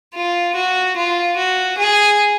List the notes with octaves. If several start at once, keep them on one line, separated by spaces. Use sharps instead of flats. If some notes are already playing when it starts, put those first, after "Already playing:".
F4
F#4
F4
F#4
G#4